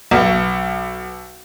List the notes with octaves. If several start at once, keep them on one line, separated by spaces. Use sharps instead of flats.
B1